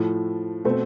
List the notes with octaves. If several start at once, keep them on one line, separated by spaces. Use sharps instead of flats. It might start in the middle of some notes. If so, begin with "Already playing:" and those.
Already playing: A2 F3 A3
B2 A3 C4